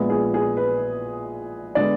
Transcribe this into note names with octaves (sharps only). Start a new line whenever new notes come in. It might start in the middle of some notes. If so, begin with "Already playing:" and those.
Already playing: A#1 A#2 G#3 B3
G#4
G#4
B4
D3 G#3 B3 D5